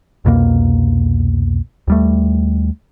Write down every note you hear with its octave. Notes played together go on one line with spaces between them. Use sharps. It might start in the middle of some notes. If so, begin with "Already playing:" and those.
C2 F2 B2 A#3
D#2 G3 A3